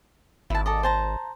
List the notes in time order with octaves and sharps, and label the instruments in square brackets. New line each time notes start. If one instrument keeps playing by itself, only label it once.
[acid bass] G#1 [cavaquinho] E4 A5
[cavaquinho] A4 D5 D#5
C5 A5 A#5